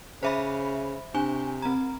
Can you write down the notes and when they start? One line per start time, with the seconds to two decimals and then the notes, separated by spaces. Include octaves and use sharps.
0.23 C#3 C5 E5 B5
1.15 C3 D4 G#5
1.62 C4 A#5